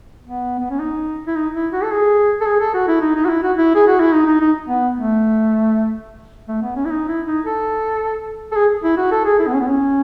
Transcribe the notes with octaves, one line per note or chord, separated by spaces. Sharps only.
B3
B3
C#4
D#4
E4
D#4
E4
F#4
A4
G#4
A4
G#4
A4
F#4
E4
D#4
D#4
F#4
E4
F#4
E4
G#4
F#4
E4
D#4
D#4
D#4
B3
A3
A3
B3
C#4
E4
D#4
E4
D#4
A4
A4
G#4
E4
F#4
A4
G#4
E4
B3
C#4
B3
C#4